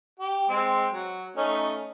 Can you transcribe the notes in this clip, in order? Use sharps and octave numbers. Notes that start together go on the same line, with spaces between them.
G4
G#3 C4
F#3
A3 C#4 D#4